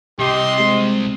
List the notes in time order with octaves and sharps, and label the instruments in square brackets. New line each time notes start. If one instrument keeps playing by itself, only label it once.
[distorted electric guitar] C2 C3 [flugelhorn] G4 [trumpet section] D#5 C6
[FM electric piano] G#3 [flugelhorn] C4